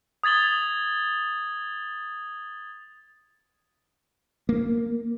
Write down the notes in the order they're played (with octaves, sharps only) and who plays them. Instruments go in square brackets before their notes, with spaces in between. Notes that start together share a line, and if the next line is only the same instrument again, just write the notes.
[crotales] D#6 G#6 A6 F#7 G7
[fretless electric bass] A#3